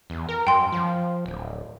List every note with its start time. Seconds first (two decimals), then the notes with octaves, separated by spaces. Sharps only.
0.10 E2
0.29 A#4
0.47 F#2 G5 C6
0.72 F3
1.26 D1